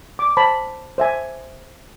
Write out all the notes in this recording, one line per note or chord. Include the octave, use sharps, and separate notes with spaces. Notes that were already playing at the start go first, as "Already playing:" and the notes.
D6
C5 A5 B5
C5 E5 G#5